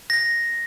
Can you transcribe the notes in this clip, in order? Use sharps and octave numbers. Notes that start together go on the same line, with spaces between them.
A#6